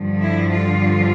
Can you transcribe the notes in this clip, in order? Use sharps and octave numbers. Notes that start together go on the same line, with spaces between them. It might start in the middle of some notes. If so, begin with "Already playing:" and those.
Already playing: G2 D3 F3
E4
F4